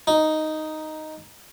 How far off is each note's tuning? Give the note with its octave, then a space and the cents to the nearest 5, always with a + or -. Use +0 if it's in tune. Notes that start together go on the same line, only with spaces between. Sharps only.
D#4 +0